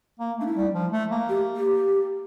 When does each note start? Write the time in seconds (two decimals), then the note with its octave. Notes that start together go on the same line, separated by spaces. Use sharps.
0.19 A#3
0.38 A3 D4
0.47 E4
0.56 G3
0.74 F3
0.92 A3
1.11 A#3
1.29 G4
1.57 G4